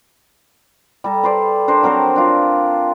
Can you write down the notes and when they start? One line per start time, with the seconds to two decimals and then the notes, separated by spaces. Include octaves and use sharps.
1.04 G3 A4 A#5
1.23 B4 C5 D5
1.68 D4 A#4 C5
1.83 F#3 C4 A#4 C5
2.16 D4 F4